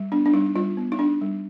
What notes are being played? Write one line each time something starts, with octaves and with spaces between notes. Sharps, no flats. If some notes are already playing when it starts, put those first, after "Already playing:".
Already playing: G3
B3 D4
D4
G3 D#4
G3 F4
B3
D#4
D4
G3